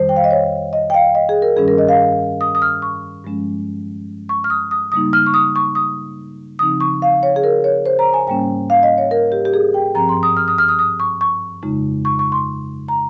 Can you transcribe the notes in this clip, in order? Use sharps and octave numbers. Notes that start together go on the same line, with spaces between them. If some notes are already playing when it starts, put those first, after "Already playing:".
Already playing: F2 D#3 G3 C5
G5
F5
D#5
C#5
D#5
G5
F5
D#5
G#4
A#4
G2 D#3 G3 C#4 G#4
A#4
D#5
F5
D#6
D#6
F6
C#6
G2 F3 G#3 C#4
C#6
F6
D#6
D#6
C#3 G3 A#3 D#4 D#6
F6
C#6
D#6
C#6
D#6
C#3 F3 C4 D#4 D#6
C#6
F5
C#5
G#4
A#4
C#5
C5
A#5
G#5
G#2 G3 A#3 C#4 G5
F5
D#5
C#5
A#4
G4
G4
G#4
G5
G2 F3 C4 A#5
C6
D#6
F6
D#6
F6
D#6
D#6
C#6
C#6
F2 C#3 G#3 D#4
C#6
C#6
C6
A#5